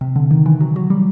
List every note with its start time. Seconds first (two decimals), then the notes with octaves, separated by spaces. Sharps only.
0.01 C3
0.16 D3
0.31 D#3
0.46 E3
0.60 F#3
0.76 F#3
0.90 G3